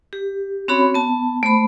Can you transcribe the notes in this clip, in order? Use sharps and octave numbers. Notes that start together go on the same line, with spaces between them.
G4
C4 C#4 F#4 C#5 B5
B3 A5
A3 C5 B5